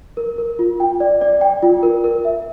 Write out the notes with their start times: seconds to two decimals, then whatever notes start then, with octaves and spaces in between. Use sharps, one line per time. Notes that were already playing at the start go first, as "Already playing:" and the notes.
0.17 A#4
0.38 A#4
0.59 F4
0.80 G5
1.00 D5
1.21 D5
1.41 G5
1.63 F4
1.83 A#4
2.04 A#4
2.25 E5